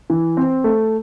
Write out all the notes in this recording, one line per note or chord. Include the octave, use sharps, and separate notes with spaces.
E3
C4
A3